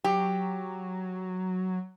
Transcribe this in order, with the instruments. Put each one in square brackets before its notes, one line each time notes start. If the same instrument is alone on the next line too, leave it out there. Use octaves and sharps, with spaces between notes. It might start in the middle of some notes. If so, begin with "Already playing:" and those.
[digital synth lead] F#3 [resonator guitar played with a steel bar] G4